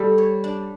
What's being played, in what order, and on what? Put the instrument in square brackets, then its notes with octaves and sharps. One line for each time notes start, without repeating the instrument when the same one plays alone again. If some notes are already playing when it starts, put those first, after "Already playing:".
Already playing: [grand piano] G3 [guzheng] A4
[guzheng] C#5
D4